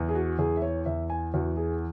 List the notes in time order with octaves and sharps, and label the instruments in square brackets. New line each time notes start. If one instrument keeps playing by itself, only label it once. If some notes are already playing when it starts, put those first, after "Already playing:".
Already playing: [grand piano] E2
G#4
F#4
E2 G#4
E5
C#5
E2 E5
G#5
E2 F#4
G#4